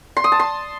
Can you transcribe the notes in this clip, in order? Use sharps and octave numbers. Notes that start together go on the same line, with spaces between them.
C6
D#6
A5
C6